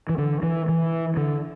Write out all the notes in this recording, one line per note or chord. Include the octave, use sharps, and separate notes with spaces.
E3
D3
E3
E3
D3